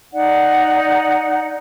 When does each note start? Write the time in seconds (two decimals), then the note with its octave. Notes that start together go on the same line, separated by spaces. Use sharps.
0.13 D#4 D5 F#5